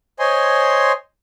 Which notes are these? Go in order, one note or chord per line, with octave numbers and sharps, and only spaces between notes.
C5 C#5 D#5 G#5 C6